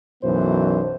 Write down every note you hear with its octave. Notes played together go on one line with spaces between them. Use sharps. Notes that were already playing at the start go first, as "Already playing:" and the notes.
B1 F#2 B2 E3 B3 C5